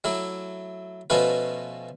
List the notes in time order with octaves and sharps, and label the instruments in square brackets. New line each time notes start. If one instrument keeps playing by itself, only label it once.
[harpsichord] F#3 A3 E4
B2 F3 A3 C#4 F#4 B4